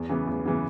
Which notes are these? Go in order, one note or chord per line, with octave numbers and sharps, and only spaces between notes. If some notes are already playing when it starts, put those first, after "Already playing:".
Already playing: E2
C#3 E3 B3
E2
C#3 E3 B3